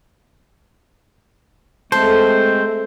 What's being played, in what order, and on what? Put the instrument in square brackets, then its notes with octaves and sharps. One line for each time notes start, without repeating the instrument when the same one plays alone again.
[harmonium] G#3 A3 C4 [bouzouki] A4 [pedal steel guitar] C5